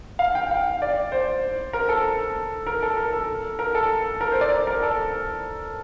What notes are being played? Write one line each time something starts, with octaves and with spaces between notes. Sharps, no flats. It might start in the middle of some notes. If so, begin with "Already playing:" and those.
F5
G5
F5
D5
C5
A#4
A4
A#4
A4
A#4
A4
A#4
A4
A#4
C5
D5
A#4
A4